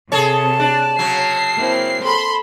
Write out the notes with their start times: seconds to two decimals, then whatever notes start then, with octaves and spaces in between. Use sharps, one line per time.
0.12 C3 G#4 A4 C#5 A5
0.60 D4 D5
0.99 C#3 F#3 C#5 C7
1.56 A#3 C4 E4
2.04 A4 B5 C6